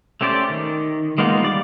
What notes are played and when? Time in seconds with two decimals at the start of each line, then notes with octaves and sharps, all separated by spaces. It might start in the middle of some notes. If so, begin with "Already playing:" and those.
0.21 A3 C#4 G4 C5 D5
0.50 D#3
1.18 G#3 A#3 B3 D#4 F4
1.42 G3 D5 D6